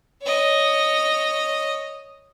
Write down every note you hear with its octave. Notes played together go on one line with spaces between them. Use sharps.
C#5 D#5